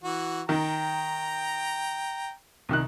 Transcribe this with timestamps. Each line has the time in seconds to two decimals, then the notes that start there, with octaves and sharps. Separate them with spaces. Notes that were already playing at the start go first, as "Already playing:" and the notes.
0.04 E3 F#4
0.49 D#3 G5 A#5
2.69 C2 D#3 F#6